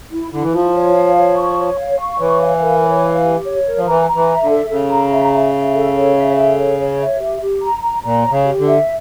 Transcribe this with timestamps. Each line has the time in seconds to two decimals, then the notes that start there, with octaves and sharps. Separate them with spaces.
0.12 E4
0.32 D3 E4
0.43 E3
0.53 F3 F4
0.74 C#5
0.95 F5
1.16 C#5
1.36 C#6
1.58 C#5
1.79 F5
1.99 C#6
2.19 E3 C#5
2.41 F5
2.62 A#4
2.83 C#5
3.03 F5
3.24 G4
3.45 C#5
3.66 A#4
3.77 F3
3.87 E3 A#5
4.08 A#5
4.15 E3
4.28 E5
4.42 D3
4.49 A4
4.70 C#3 A4
4.91 A#5
5.12 E5
5.33 E5
5.54 E5
5.74 A4
5.95 C#5
6.16 E5
6.37 A4
6.58 C#5
6.79 C#5
7.00 E5
7.21 G4
7.41 G4
7.62 A#5
7.83 A#5
8.03 A#2 A#5
8.24 C#5
8.31 C#3
8.45 G4
8.59 D3
8.67 E5